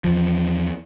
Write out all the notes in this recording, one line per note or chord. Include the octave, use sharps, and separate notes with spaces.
E2 F3